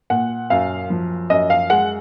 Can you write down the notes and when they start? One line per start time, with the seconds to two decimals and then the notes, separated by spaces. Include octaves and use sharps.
0.10 A#2 F#5
0.50 F#2 F5
0.90 F3
1.30 F#2 D#5
1.50 F5
1.70 G#3 F#5